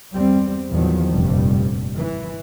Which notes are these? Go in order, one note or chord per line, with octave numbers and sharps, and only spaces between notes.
E2 G3 C4
E2 A#2 D#3 F3 F#3
F1 A#1 G2 G3
E3